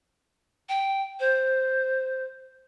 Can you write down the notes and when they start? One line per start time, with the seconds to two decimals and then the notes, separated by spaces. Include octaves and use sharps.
0.69 G5
1.20 C5